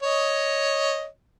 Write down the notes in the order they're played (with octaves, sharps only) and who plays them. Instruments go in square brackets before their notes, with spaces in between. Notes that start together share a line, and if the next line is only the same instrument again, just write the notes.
[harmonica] C#5 D#5